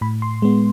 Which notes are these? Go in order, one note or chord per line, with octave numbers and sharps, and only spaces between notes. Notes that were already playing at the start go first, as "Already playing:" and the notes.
A2 B5
C6
G#3 B3